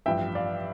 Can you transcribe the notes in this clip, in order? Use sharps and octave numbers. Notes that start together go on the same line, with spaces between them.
A1 G2 F3 E5 G5
D5 F5